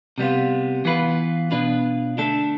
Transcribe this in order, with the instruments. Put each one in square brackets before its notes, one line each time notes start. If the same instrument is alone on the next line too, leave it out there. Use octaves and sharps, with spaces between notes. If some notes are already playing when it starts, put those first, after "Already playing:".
[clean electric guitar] C3 G3 B3 F4
E3 B3 F4 B4
B2 B3 D4 F4 B4
D3 A3 D4 A4